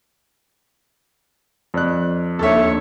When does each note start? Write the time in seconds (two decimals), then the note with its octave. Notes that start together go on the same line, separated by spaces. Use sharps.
1.74 F2 D5 F#6
2.39 D#2 D4 A4 C#5 E5